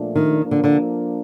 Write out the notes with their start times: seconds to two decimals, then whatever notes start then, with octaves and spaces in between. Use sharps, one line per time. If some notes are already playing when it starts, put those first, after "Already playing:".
Already playing: A#2 F3 A3 D4
0.16 D#3
0.40 F3 A#3 D4
0.51 D3
0.64 D3